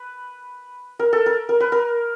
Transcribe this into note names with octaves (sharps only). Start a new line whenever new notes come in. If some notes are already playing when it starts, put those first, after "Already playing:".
Already playing: B4
A#4
A4
A#4
A#4
B4
A#4